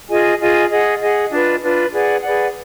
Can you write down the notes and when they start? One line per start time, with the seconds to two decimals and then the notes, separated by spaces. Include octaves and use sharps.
0.10 F4 G#4 D#5 G#5
0.40 F4 G#4 D#5 G#5
0.71 G#4 D#5 F#5
1.02 G#4 D#5 F#5
1.31 D4 F4 B4
1.62 D4 F4 B4
1.92 G#4 B4 D5 F#5
2.22 G#4 B4 D5 F#5